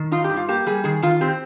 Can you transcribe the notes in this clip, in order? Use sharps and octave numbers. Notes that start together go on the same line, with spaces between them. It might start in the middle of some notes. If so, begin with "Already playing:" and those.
Already playing: D#3
D#4 F4
G4
G2
F4
A#3 G4
G3 G#4
D#3 G#4
D#3 F4
C4 G4